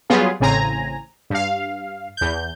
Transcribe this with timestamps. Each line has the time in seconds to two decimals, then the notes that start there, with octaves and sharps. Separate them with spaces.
0.10 F#3 G3 B3 F4 G#4
0.40 A1 A2 C#3 C4 G#5 A#5
1.30 G2 F5
2.17 E2 G6